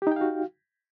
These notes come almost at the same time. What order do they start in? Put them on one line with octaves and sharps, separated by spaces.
G4 D#4 G5 F5 F#4